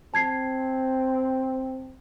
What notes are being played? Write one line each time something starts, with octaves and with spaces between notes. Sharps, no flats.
C4 A5 G#6 C7